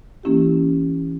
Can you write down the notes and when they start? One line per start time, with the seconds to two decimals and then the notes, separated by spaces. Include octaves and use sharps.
0.23 E3 A#3 C#4 E4 G4